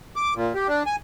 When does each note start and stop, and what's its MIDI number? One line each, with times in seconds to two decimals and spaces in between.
0.16 0.34 86
0.35 0.53 46
0.55 0.68 67
0.68 0.83 62
0.86 0.96 80